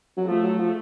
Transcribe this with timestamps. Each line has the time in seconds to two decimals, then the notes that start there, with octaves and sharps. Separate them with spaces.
0.17 F#3
0.27 F3 A3
0.43 F#3
0.59 F3